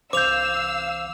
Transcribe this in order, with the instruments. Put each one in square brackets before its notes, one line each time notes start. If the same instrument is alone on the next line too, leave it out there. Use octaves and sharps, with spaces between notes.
[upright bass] C2 E3 [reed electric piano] C5 G6 [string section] F5 E6 [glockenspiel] D6 F7